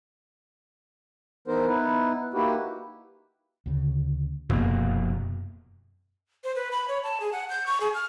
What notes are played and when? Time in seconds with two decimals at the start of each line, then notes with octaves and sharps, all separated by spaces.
1.48 E3 B3 D#4 A#4 C5
1.66 B3 D#4 E4 B4
2.34 A#3 D#4 E4 F#4 G4 B4
3.66 D2 C#3
4.50 F1 F#2 B2 A#3 B3
6.44 C5
6.56 B4
6.71 B5
6.88 C#5
7.03 A5
7.20 G#4
7.33 F#5
7.49 G6
7.66 C#6
7.80 G#4
7.94 F6